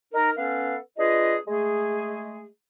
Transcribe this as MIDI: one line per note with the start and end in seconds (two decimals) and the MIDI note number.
0.13 0.31 63
0.13 0.31 70
0.37 0.76 59
0.37 0.76 61
0.37 0.76 69
0.37 0.76 71
0.37 0.76 77
0.98 1.36 62
0.98 1.36 65
0.98 1.36 68
0.98 1.36 71
0.98 1.36 75
1.47 2.46 56
1.47 2.46 57
1.47 2.46 68